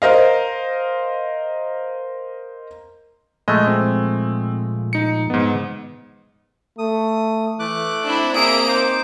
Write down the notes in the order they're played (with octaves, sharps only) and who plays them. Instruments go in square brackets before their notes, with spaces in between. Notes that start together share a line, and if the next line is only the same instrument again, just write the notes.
[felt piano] A#4 C5 D#5 F5
[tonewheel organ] A#2 F3 [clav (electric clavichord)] G#3 A3 [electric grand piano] D#5
[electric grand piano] C4
D#4 C#7
[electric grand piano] G#2 B3 [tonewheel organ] D#5
[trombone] A3 [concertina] D#6
[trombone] E3 [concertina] A3 D6 F#6
[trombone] C4 [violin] D4 E4
[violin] A#3 D7 [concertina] G#4 E5 D#6
[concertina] D#4 C5 D6